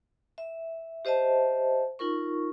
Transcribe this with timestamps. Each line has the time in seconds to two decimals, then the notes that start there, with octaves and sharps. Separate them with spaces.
0.38 E5
1.05 G4 C5 D#5 E5 A5
1.99 D#4 F4 A#4 C#6